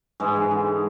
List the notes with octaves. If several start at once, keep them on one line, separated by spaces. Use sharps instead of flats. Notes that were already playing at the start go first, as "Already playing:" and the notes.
G#2 E3 G#3
G#2
D3